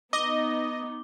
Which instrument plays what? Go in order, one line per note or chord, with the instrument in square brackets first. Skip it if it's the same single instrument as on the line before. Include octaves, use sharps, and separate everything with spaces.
[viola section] B3 D#4 [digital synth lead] D#5 [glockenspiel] D6 G7